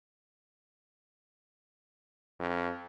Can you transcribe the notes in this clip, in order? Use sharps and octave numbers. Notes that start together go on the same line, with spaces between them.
F2